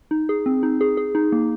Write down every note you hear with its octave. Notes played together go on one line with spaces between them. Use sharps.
D#4
G#4
C4
D#4
G#4
G#4
D#4
A#3